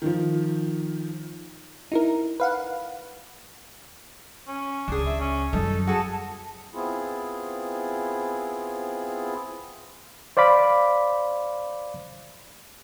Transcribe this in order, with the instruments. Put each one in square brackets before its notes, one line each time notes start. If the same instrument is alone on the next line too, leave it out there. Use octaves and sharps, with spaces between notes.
[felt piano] D#3 F3
[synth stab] D#4 E4 A#4
B4 F5 F#5
[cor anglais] C#4
[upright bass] C#2 [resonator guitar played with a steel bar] D4 G#4
[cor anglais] E5
C#4
[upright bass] F#2 G3 [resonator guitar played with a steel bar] D#4 [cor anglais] A4
[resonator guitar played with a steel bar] F#4 A4 [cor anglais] G#4
[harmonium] B3 C4 E4 F4 G#4
[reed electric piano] C5 D5 F5 B5 D6